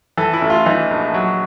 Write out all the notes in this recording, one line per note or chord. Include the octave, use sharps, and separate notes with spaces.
E3 A4
E4
A1
F4
E3 D#4
A#1
F#3